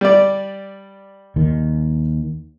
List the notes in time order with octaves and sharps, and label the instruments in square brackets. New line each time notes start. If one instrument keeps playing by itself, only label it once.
[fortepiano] G3 D5
[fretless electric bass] D#2 D#3